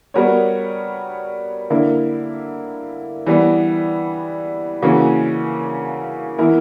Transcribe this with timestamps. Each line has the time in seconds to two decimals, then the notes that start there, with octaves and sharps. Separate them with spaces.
0.14 G3 B3 F#4 A#4 C#5
1.70 D3 A#3 E4 A#4
3.26 E3 G3 B3
4.82 C#3 E3 A#3 C#4 F#4
6.38 E3 B3 E4 A#4